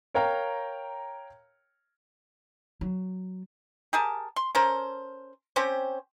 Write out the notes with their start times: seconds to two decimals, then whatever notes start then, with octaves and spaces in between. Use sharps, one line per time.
0.14 A#4 C#5 F5 G5 A#5 F6
2.81 F#3
3.93 G4 G#4 A#4 A5
4.36 C6
4.55 C#4 A4 A#4 C5
5.56 C4 C#4 G4 C5